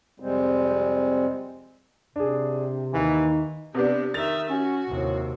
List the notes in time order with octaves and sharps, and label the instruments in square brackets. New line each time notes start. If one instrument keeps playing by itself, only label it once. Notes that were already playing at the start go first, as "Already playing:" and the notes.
[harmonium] F2 C3 G3 G#3 C4
[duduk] C3 [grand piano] D4 G#4
[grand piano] D#2 [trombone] E3 [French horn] D#4
[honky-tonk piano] C3 B3 D4 [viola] G4
[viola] D#3 E5 [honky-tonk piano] A6 F7
[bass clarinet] C#4 [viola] F#4
[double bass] D#2 C3 [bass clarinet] A2